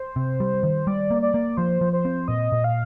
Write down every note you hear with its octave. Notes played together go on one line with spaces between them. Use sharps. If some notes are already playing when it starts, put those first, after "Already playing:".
Already playing: C5
C3
G3
D#3
G3 D5
A#3
D5
A#3
F3 C5
F3
C5
C4
A#2 D#5
A#2
F5